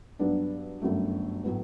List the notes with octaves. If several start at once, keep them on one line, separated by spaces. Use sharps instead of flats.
G2 F#3 B3 D4
G1 F#2 F#3 A3
A2 F#3 B3